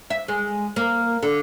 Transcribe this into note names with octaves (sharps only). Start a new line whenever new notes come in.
E5
G#3
A#3
D3